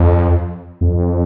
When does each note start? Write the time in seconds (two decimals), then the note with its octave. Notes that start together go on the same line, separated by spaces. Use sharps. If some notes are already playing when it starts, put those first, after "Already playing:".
Already playing: F2
0.81 F2